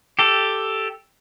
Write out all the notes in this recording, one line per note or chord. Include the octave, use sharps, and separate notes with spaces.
G4 A4